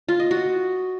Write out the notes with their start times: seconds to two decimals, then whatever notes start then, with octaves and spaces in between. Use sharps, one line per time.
0.08 F4
0.20 D#5
0.31 F#4